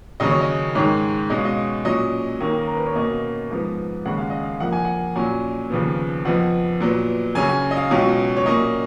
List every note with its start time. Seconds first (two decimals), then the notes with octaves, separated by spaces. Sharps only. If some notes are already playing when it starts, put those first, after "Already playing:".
0.20 D#2 C#3 F#3 C#4 D#5
0.31 C#5
0.41 D#5
0.75 G#2 D#3 G#3 C#5
1.30 B2 G#3 C#4 D#5
1.38 F5
1.45 D#5
1.85 A#2 F#3 C#4 D#5
2.40 D#2 D#3 A#3 C#4
2.67 A#4
2.77 B4
2.86 C#5
2.95 B2 A#3 C#4 D#5
3.51 G#2 F3 B3
4.05 D#2 C#3 G#3 C#4 F#5
4.17 F5
4.30 D#5
4.43 F5
4.60 F2 F3 A#3 F#5
4.73 G#5
4.85 F#5
5.16 A#2 F#3 C#4 G#5
5.70 D#2 C#3 F3 B3
6.25 F2 F3 B3 F#5
6.80 A#2 F#3 B3
7.35 F#2 C#3 F#3 C#4 G#5
7.49 G#5
7.71 D#5
7.76 F5
7.90 C#2 B2 F#3 C#4
8.37 C#5
8.46 A#2 F#3 A#3 C#4 D#5